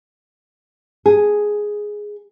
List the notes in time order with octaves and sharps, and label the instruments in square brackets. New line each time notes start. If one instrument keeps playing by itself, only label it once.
[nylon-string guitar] G#4